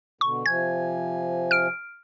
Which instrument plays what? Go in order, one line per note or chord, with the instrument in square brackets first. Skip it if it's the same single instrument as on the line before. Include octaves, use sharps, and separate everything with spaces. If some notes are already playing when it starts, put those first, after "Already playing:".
[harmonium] B2 D3 [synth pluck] C#6
[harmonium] C3 F3 G#5 [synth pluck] G#6
[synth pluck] F6 D7